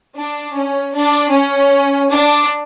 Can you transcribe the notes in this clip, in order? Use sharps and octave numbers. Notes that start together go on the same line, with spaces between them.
D4
C#4
D4
C#4
D4